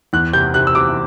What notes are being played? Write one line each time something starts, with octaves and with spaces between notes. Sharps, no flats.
E2 F#6
C3 G6
C3 F#6
E6
C3 D6